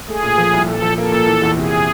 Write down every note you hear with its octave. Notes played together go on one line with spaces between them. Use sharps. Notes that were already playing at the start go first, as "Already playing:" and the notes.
A3 G#4
A#2
F3
C2
A#2 A4
F3
A#3 A4
A#2
E3
E2
C3 G#4